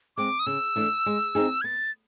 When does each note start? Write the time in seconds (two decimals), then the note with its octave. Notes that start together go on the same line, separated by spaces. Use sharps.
0.17 G#3 C4 D6
0.39 D#6
0.46 C#3 E6
0.76 E3 A3 D4
1.06 G#3
1.35 C4 D#4 G#4
1.61 G#6
1.64 B3 A6